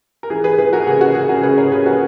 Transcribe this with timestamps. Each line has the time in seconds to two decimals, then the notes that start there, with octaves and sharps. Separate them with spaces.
0.23 A#4
0.30 E3 G#4
0.44 G#4 B4
0.58 E3 G#4 B4
0.73 F#4 A#4
0.87 C#3 G#4
1.01 F#4
1.15 C#3 G#4
1.29 F#4 A#4
1.43 C#3 G#4 B4
1.58 A#4 C#5
1.72 C#3 G#4 B4
1.86 F#4 A#4